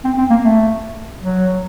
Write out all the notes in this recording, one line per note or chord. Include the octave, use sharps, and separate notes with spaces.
C4
C4
A#3
A3
F#3